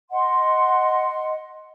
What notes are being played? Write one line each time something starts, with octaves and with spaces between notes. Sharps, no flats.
D#5 F#5 C6